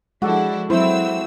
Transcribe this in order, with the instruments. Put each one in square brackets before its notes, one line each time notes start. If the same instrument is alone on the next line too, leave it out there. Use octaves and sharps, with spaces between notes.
[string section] F3 D4 E4 [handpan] G#3 [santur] F#4 A4 D5
[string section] F#3 C4 E6 [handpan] E4 [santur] C5